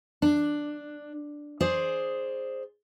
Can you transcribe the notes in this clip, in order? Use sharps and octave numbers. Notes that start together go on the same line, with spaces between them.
D4
G#4 C5 D5